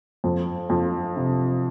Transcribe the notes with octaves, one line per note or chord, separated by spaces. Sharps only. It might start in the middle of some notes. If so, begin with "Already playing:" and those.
F2
F2
C3